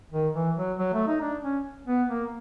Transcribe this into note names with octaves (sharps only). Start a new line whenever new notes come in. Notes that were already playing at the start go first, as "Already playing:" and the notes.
D#3
E3
F#3
F#3
A3
D#4
D4
C#4
B3
A#3